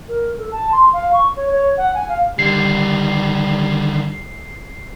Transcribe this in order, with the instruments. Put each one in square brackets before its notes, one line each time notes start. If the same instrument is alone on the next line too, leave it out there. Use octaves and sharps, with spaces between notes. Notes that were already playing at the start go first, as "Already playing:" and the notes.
[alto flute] A#4
A4
A5
C6
F5
C#6
C#5
C#5
F#5
G#5
F5
[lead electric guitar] D3 D#3 [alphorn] G3 [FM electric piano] C7